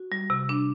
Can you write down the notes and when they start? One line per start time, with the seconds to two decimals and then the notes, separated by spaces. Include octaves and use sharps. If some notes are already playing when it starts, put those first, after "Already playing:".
Already playing: F#4
0.12 G3
0.30 C3
0.49 D4